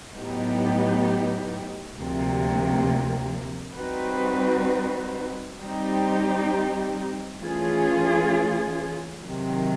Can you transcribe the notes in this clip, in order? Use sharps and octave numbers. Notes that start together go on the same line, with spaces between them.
A2 F#3 B3 D#4 G4
D2 C3 F3 A#3
G3 C4 D#4 F#4 B4
G3 C4 D#4 G4
E3 A3 C#4 F4 G#4
C3 D#3 F#3